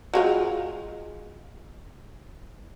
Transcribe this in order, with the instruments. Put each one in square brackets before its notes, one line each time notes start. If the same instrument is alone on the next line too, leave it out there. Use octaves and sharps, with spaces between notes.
[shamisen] F#3 G#3 F4